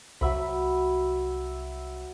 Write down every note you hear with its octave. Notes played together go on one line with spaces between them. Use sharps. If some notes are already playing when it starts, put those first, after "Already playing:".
C2 F#3 E5 B5